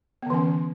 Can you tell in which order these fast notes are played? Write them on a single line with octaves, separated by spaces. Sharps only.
B3 D3 E3 C#4